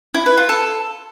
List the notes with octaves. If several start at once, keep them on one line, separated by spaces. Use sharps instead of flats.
E4
B4
F4
A4